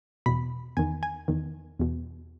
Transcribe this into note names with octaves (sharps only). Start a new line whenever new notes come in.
E2 B2 B5
E2 D#3 G#5
G#5
E2 D#3
E2 B2